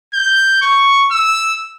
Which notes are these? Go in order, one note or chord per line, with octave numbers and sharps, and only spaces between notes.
G6
C#6
E6